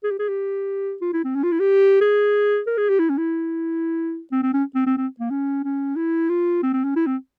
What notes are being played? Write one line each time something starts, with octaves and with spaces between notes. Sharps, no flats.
G#4
G4
G#4
G4
F4
E4
C4
C#4
F4
E4
G4
G#4
A#4
G#4
G4
E4
C#4
E4
C4
C4
C#4
C4
C4
C4
A#3
C#4
C#4
E4
F4
C4
C4
C#4
E4
C4